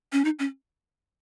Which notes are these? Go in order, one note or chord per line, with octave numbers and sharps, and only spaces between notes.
C#4
D#4
C#4